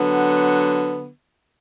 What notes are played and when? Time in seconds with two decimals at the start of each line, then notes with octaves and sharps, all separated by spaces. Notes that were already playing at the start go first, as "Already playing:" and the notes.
Already playing: D3 F#3 B3
0.11 F#5